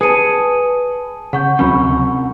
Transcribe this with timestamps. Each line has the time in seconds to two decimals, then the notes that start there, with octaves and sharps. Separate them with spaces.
0.01 G#4 B4 A5 D#6 C#7 D#7
1.33 C#3 F#5 C#6 G6
1.59 D2 C3 F#3 C#4 A#4 F#5 B5 C#6